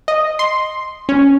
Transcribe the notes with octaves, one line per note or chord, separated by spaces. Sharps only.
D#5
C6
C#4